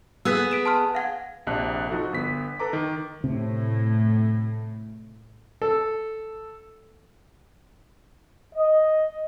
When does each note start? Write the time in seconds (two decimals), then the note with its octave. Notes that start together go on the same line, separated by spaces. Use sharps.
0.25 B3 G#4 F#5 E6 F#6 B6
0.51 B6 D7 E7
0.65 A5 C6 F6
0.95 F5 F#5 G#6
1.47 A#1 C3 D4 D#5 F#6
1.90 F3 D#4 F#4 A4
2.13 G1 B3 B6
2.59 A4 B4 A#5 D6
2.73 D#3
3.24 A2 C3
5.62 A4
8.55 D#5